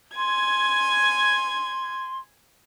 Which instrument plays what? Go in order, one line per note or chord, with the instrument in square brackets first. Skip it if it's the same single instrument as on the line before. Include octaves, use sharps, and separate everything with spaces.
[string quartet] G#5 G#6 [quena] C6